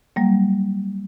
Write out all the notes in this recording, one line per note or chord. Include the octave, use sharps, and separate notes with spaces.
F#3 G3 A#3